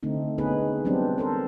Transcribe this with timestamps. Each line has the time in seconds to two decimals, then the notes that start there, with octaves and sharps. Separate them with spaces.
0.03 D3 A3 C4 D#4
0.38 B3 C#4 D#4 G#4 B4
0.85 F#3 G3 B3 C4 D4
1.18 A4 A#4 C5